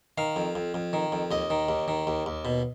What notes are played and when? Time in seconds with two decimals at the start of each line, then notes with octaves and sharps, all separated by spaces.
0.18 D#3 F5
0.36 F2
0.55 F2
0.74 F2
0.93 D#3
1.12 F2
1.31 D#2 D#5
1.50 D#3
1.69 D#2
1.88 D#3
2.07 D#2
2.26 D#2
2.45 B2